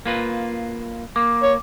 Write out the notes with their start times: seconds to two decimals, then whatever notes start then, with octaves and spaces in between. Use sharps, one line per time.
0.06 A#3 F4 B4
1.16 A#3 D6
1.43 C#5